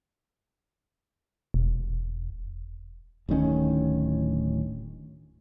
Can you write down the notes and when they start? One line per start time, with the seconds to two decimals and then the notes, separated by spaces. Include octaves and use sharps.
1.54 E1
3.29 D1 A2 D#3 C#4